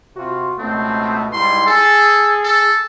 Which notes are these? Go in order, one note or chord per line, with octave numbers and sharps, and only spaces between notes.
C3 F4 F#4
C#2 B2 A3 C4
G#2 G3 E4 C6
G#4 A4
A4